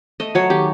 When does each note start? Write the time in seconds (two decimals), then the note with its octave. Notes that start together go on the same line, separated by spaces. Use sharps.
0.20 A3 D#5
0.35 F#3 C#5
0.50 D#3 G4